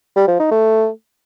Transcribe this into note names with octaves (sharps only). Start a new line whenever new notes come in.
G3
F3
D#4
A3